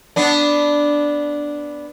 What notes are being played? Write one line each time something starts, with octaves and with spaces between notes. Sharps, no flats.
B3 D4